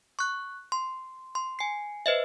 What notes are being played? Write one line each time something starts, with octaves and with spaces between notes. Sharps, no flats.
C#6 F#6
C6
C6
G#5 C7
B4 C5 D#5 E5